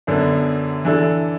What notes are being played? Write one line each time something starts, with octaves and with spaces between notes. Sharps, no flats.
F#2 D3 B3 D4
E3 D4 A4